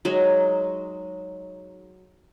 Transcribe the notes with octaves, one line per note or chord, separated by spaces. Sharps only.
F#3 G#3 D#4